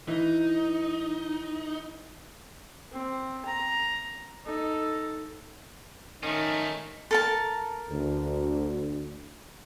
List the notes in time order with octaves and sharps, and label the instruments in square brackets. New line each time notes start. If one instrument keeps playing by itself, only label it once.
[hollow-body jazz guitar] E3 [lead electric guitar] D#4
[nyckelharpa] C4
A#5
D#4 A4
[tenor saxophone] D#3 [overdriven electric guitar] A3 C#4 [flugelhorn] D#4
[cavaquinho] A4 A#4 A5
[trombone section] D2